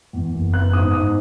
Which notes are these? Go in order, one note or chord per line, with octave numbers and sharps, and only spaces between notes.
E2
F#1
B3 F#6
G#2 D#6
G#2 D#6